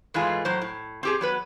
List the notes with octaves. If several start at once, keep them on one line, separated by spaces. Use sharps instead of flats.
G#2 E3 G#3 A3 F4 G#5
A2 F#3 C5
A2
C4 G4 G#4
F#3 B3 B4